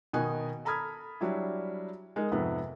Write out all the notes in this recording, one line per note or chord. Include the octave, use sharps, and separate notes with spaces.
B2 D#3 D#4 G#5 F#6
A4 A#5 B5 D#6 F6 G#6
F#3 G3 D4 E4
G#3 D#4 A#4
F2 G#2 C3 F3 B3